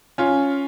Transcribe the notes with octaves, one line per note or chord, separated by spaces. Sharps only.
C#4 F4